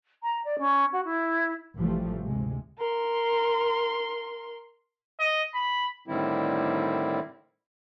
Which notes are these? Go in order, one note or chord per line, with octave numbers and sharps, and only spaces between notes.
A#5
D5
C#4
F#4
E4
A1 C3 E3 F3 G3 A3
D2 G#2 C3 G#3
A#4 C6
D#5
B5
A2 D3 D#3 G3 C4 E4